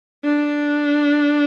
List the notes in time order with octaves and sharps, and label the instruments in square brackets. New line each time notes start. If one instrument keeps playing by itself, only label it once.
[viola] D4